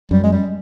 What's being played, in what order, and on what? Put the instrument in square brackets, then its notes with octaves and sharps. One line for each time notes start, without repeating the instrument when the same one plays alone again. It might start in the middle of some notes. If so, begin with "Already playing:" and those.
[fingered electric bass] F#2 [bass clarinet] G3
[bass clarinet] G#3
G3